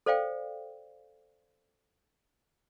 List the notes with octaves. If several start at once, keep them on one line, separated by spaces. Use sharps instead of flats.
A4 C5 D5 F5 G5